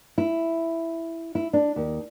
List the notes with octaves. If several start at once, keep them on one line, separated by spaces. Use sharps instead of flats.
E4
E4
D4
D#2